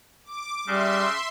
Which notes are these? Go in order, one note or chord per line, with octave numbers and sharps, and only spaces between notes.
D6
C#3 G3 E5 C6